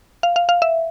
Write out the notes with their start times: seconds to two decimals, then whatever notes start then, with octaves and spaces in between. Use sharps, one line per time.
0.23 F5
0.36 F5
0.49 F5
0.62 E5